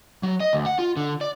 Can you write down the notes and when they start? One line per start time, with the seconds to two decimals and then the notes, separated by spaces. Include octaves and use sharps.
0.23 F#3
0.40 D#5
0.53 D2
0.66 F#5
0.79 F4
0.97 D3
1.21 D5